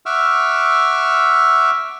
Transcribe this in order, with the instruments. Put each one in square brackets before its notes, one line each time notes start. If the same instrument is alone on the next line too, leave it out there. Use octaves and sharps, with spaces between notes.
[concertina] E5 F#5 C#6 D6 E6 F6